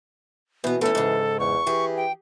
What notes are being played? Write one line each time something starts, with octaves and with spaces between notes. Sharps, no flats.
B2 E3 B3
E3 A3 C#4 A4
G#2 C#3
E2 C#6
E3 G4 G#4
G5